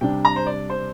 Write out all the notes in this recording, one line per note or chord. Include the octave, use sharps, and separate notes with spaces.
C3 G3 D4 G5
A#5
C5
D5
C5